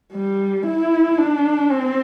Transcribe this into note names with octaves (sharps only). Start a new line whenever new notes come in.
G3
E4
D4
C4